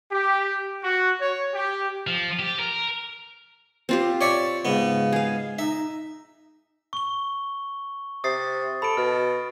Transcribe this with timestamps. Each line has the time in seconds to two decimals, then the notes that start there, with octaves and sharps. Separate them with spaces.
0.12 G4
0.83 F#4
1.21 C#5
1.54 G4
2.07 F3
2.39 G4
2.59 A#4
3.89 C4 F4 G4
4.21 C#5 D5 E5
4.65 G#2 C#3 B3
5.12 G#4 F5
5.59 D#4 E5
6.93 C#6 G7
8.24 C3 D#6 A6 C7
8.82 A4 B5 D7
8.97 B2 F6